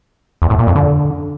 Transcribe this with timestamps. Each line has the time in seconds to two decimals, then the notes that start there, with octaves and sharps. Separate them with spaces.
0.42 E2
0.50 A2
0.59 A#2
0.67 F2
0.75 D3